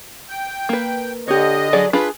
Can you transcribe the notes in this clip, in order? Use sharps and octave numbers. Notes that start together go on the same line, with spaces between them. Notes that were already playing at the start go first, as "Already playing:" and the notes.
G5
A#3 B4
D3 G4 C#5 D#5
F#3 G#4 D5
D4 F4 G#4 B4 B5